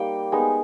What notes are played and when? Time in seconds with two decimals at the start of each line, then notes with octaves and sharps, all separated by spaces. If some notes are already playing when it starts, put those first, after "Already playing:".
Already playing: G3 A#3 D#4 G5
0.32 G#3 B3 D#4 G#5